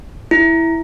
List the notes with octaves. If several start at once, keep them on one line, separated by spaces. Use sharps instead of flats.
E4